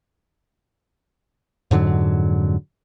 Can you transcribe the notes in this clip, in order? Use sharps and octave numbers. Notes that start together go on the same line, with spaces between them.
F2 G#2 D3 F#3